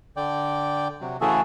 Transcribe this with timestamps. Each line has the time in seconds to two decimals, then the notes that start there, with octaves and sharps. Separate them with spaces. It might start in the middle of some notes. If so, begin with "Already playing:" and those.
0.17 D3 D5 G5
1.01 C3 F#3
1.21 C#3 E3 A3 F#4 G#4 A4